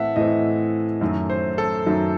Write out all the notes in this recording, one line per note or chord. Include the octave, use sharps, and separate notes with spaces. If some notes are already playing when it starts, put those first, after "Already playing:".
Already playing: A2 E3 A3 C4 E5 F#5 A5
A2 E3 A3 C4 D#5
F#2 D#3 F#3 A3
C5
A4
F#2 D#3 F#3 A3